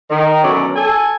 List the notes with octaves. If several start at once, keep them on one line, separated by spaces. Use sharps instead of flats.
D#3
F#2 B2 D3 F#3 C#4 D5
A4 G#5